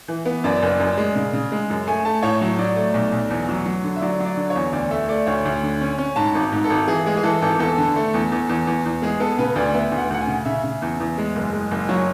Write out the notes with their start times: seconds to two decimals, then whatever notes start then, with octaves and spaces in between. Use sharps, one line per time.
0.08 E3
0.25 B3
0.44 F#2 D5
0.62 F#1
0.79 F#2
0.97 G#3
1.16 C#3
1.33 C#3
1.52 G#3
1.70 F#2
1.87 A3 G#5
2.05 A3 A5
2.23 A2 C#5
2.41 F#3
2.58 F#3 D5
2.76 A3
2.94 B1
3.12 B1
3.30 E2
3.49 F#3
3.66 F#3
3.84 D3
3.96 E5
4.01 F#3 D5
4.20 F#3 D5
4.37 D3
4.50 C#5
4.56 E2
4.73 D2 D5
4.91 A3 E5
5.09 A3 D5
5.26 D2 C#5
5.45 D2
5.63 D3
5.81 C#4
5.98 C#4
6.16 G#2 A5
6.35 G#1
6.52 G#2
6.64 A4
6.70 G#1
6.87 E3 G#4
7.06 G#3 G#4
7.17 G#4
7.23 E3 A4
7.42 G#1 A4
7.59 E2 A4
7.78 D3
7.96 A3
8.14 E2
8.32 E2
8.49 E2
8.67 E2
8.85 E2
9.02 G#3 G#4
9.20 B3 A4
9.38 C#3 B4
9.56 D2 D5
9.74 B3 E5
9.92 D2
9.97 F#5
10.10 D2 F#5
10.21 G#5
10.27 C#3
10.45 C#3 E5
10.64 C#3
10.82 E2
11.00 E2
11.18 G#3
11.36 F#1
11.53 G#3
11.71 F#1
11.89 F#3 C#5